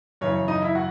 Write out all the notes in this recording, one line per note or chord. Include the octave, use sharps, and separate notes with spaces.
F#2 C#3 E3 C#5
C#5
D#4 D#5
E4 E5
F#4 F#5